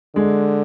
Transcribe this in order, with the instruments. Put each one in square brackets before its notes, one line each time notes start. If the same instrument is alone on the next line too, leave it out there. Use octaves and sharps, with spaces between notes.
[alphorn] D3 [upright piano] G#3